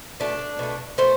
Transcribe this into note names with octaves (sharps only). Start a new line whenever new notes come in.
B2 A3 D4
B2 A3
B2 A3 C5